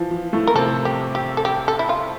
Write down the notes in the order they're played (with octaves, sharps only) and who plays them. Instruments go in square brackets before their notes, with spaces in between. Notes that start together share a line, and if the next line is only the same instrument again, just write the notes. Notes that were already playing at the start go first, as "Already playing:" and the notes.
Already playing: [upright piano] E3 F3
F3
A2 A3
[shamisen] A#4
[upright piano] C3 C4 [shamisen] A4
[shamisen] G4
G4
A4
G4
A4
E4
F4